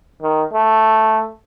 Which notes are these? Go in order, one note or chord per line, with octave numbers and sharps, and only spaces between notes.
D#3
A3